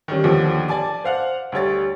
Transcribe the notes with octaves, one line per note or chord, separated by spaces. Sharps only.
D#3 G3 C#4
D#2 D3 F3
D5 G#5 A5 D6
C5 F5 F#5
D2 G3 C#5 A6